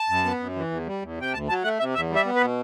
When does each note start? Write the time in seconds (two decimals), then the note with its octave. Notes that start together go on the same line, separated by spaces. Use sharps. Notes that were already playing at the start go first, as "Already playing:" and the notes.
Already playing: A5
0.09 F#2
0.25 B3
0.40 F#2
0.56 E3
0.71 E2
0.86 G3
1.02 E2
1.17 C3 G5
1.33 D2 A5
1.48 F#3 A5
1.64 A3 F#5
1.79 C3 E5
1.95 E2 E5
2.10 G3
2.16 E5
2.25 B3
2.36 B4
2.41 B2